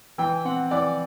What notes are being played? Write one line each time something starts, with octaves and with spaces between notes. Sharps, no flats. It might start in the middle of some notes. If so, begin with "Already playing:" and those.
E3 G5
C4 F#5
E3 D5